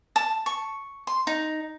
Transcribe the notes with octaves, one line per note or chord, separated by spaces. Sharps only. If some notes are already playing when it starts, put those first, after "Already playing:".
A5
C#6
C6
D#4